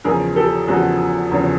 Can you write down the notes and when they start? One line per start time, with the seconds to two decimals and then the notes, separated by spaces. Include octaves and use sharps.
0.04 E2 C#3 F3 G#4 A#4
0.36 G4 A4
0.67 E2 C#3 F3 F#4 G#4
1.31 E2 C#3 F3